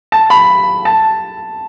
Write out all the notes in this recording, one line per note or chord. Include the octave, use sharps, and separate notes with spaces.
A5
B5
A5